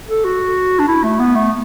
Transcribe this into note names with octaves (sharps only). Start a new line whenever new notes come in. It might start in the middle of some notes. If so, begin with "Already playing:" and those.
A4
F#4
D4
E4
A3
B3
A3